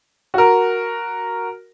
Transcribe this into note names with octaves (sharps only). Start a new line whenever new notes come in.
F#4 A#4